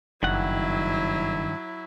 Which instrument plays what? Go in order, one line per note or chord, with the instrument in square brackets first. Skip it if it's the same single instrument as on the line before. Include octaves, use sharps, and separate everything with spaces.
[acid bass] F#1 [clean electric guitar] G2 D#3 F#5 [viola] F#3 E4